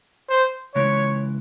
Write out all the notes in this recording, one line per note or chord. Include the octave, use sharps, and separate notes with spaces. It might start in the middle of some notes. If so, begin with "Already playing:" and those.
C5
C#3 E3 G#3 C#5